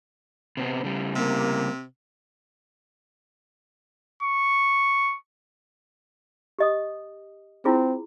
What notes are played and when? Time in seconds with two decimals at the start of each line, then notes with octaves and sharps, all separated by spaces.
0.57 C3 B3 C4
0.84 C#3 G3
1.15 C3 A#3
4.23 C#6
6.59 G4 D#5 D#6
7.65 C4 E4 F4 G#4